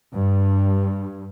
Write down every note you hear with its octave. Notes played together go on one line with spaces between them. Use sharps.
G2